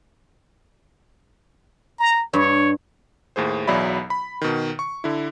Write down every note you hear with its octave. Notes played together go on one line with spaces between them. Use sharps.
A#5
G2 C#5
D#2 A2 G#4 C5
B1 E2 F#3 D5 E5 B5
B5
B2 D#3
C#6
D3 E4